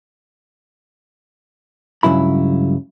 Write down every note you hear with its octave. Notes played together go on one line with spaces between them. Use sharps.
C#2 G2 C#3 F#3 E4 B5